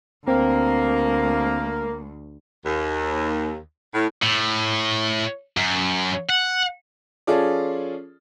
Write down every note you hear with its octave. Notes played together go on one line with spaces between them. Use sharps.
D2 A#3 C4
D#2
A2
A2
F#2
F#5
F3 C#4 F4 G#4 A4 D5